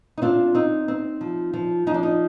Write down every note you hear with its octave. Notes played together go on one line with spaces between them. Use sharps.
D#4
C4 D4 F4
C4 D#4
C4
F3
F3
F3 D#4
D4
D#4